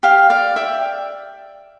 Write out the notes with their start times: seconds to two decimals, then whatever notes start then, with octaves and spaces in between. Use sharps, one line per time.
0.03 G4 F5
0.30 D5 F5
0.56 D5 E5 G5